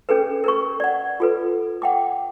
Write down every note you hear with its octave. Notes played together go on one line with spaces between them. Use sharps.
C#4 G#4 A4 B4
A#4 B4 C#6
D5 F#5
F4 A4 B4
F#5 G5 D6